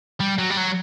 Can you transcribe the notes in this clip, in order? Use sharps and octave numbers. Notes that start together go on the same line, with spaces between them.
G3
F#3
G3
F#3